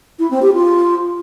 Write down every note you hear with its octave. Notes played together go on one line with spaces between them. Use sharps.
E4
C4
G4
F4